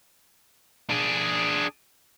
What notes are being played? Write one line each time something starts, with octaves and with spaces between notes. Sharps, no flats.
D4 G#4